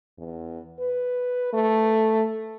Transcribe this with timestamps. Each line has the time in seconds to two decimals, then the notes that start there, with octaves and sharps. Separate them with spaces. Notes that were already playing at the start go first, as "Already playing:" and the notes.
0.18 E2
0.79 B4
1.53 A3